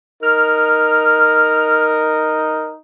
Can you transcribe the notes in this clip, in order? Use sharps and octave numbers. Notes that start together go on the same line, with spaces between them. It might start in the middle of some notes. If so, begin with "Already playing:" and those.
D#4 A#4 F6